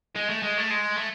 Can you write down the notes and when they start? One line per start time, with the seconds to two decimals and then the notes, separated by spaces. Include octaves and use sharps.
0.16 G#3
0.30 A3
0.42 G#3
0.58 A3
0.70 G#3
0.97 A3